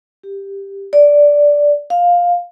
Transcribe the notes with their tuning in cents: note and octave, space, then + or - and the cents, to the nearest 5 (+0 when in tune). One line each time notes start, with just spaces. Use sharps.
G4 +10
D5 -5
F5 +10